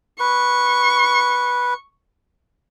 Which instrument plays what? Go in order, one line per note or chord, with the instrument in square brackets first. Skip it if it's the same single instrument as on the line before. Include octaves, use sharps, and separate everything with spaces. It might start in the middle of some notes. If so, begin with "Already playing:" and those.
[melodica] B4 [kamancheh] C#6